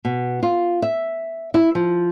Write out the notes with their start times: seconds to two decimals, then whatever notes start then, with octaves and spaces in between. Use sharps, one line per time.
0.05 B2
0.43 F4
0.82 E5
1.54 E4
1.75 F3